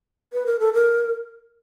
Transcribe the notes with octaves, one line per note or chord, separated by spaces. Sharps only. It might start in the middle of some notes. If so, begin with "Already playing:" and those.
B4
A#4
A4
A#4